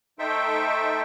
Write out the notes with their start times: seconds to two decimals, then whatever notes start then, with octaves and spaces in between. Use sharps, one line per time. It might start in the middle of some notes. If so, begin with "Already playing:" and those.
0.19 A3 D#4 A4 C5 E5 G5